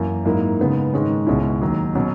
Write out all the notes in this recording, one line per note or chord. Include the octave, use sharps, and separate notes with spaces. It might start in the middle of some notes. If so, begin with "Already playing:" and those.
Already playing: F#2 E3 A#3
G#2 F#3 A#3 E4
C#3 G#3 B3 D#4
G#2 D#3 G#3 C#4
C#2 B2 G#3 C#4 E4
D#2 D#3 F#3
B2 F#3 C#4